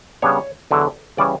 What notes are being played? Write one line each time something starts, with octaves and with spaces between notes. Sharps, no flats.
C#3 G3 B3 D4 C#5
E2 D3 F#3
C#3 E3 G3 C#4 D5